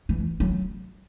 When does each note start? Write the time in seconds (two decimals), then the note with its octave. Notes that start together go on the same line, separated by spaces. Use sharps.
0.09 E3
0.40 F#3